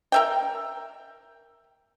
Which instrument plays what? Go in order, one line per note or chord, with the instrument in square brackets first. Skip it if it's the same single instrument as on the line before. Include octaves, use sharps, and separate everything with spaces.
[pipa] A#4 E5 G5